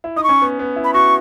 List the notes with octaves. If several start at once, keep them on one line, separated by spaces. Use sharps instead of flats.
E4
D#4 D#6
C#6
C#4
B3
B3
E4
B5
F#4 C#6